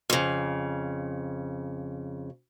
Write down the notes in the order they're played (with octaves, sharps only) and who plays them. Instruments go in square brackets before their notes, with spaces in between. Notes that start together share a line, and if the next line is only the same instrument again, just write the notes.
[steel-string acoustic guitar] F2 C#3